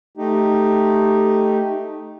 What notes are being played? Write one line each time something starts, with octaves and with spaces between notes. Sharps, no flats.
A3 D#4 G4